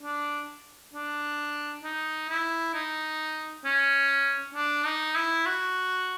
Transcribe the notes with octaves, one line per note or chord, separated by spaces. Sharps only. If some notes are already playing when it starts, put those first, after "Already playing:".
D4
D4
D#4
E4
D#4
C#4
D4
D#4
E4
F#4